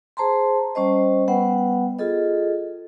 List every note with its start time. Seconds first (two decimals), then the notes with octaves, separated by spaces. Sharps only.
0.17 G#4 C5 A5 A#5 C6
0.75 G3 C#4 C5 D#5
1.28 G3 B3 B4 F#5
1.99 F4 G#4 A4 D#5